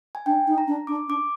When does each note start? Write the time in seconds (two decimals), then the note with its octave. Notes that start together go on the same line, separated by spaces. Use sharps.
0.15 G#5
0.26 D4 G5
0.47 D#4
0.58 A#5
0.67 D4
0.87 D4 D6
1.08 D4 D6